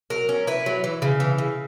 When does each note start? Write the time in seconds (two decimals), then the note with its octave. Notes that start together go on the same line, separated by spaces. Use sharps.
0.10 F#3 A#4
0.29 C#4
0.47 E4 B4
0.66 F#3
0.84 E3
1.02 C#3
1.20 E3
1.38 C#3